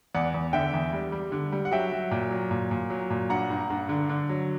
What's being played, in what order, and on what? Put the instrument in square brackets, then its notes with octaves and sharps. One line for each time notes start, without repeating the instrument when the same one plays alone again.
[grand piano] E2 D5 F#5
E2
D3 E5 G5
E2
G3
G3
D3
G3
F#5
F#3 E5 G5
F#3
A#2
F#3
A#2
A#2
F#3
A#2
G2 F#5 A#5
G2
G2
D3
D3
F#3